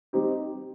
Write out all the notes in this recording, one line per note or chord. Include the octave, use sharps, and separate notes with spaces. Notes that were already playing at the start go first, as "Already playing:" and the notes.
G3 C4 D#4 G4